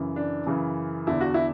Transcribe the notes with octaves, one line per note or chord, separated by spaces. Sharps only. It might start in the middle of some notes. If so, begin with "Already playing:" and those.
Already playing: F#2 C#3 E3
D4
F#2 C#3 E3
E2 D3 E4
F#4
E4